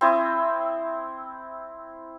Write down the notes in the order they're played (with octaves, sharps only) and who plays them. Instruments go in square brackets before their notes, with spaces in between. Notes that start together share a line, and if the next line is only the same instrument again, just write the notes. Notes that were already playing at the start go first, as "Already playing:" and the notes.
[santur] C4 E4 D#6